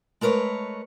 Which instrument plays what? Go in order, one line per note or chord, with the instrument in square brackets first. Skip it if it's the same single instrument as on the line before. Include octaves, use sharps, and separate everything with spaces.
[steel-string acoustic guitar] G#3 A3 A#4 B4 C#5